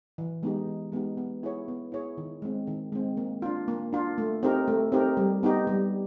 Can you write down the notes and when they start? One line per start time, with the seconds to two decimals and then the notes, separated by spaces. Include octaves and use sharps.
0.18 E3
0.43 G#3 B3 D#4 G4
0.67 E3
0.92 G#3 B3 D#4 G4
1.17 B3
1.43 E4 G#4 C#5
1.68 B3
1.92 E4 G#4 C#5
2.17 D#3
2.42 G#3 C4
2.67 D#3
2.92 G#3 C4
3.17 A#3
3.42 D4 F4
3.68 A#3
3.93 D4 F4
4.18 A3
4.43 C4 D#4 G4 A#4
4.68 A3
4.92 C4 D#4 G4 A#4
5.17 G3
5.43 B3 D#4 G4
5.67 G3